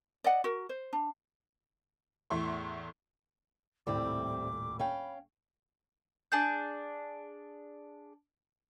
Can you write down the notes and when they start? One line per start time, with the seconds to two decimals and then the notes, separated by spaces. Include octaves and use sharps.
0.24 D5 D#5 F#5
0.44 F#4 A#4
0.69 C5
0.93 D4
2.30 E2 A2 E5 C6 C#6
3.87 D#1 C2 A2 G3 C4 E4 D6
4.79 C#4 F5 G5 B5
6.32 D4 G#4 A5 G6